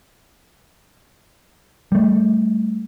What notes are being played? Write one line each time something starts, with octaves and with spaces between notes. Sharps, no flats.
G3 A3